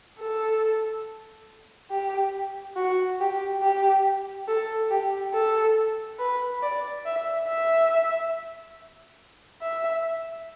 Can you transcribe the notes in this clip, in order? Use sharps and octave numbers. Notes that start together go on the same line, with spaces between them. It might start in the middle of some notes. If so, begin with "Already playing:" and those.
A4
G4
F#4
G4
G4
A4
G4
A4
B4
D5
E5
E5
E5